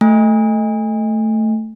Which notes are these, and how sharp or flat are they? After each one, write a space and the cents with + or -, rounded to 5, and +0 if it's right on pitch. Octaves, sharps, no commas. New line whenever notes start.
A3 +0 G#5 -35